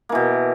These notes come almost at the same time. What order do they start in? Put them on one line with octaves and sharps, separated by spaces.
A#3 E3 B2